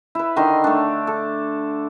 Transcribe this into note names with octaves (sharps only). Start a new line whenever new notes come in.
E4 B4
D3 D#3 D#4 C6
A3 D4
A4